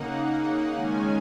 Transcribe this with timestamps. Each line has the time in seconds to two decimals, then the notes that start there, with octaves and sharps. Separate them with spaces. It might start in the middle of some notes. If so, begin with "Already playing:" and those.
Already playing: C#3 A#3 D#4 F#5
0.71 D#3 G#3 C#4 G#5